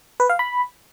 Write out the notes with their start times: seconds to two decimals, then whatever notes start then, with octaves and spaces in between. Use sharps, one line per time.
0.20 B4
0.29 F5
0.39 B5